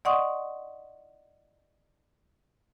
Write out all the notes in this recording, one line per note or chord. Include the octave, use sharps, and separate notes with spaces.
D5 D#5 F#5 C6 C#6 D#6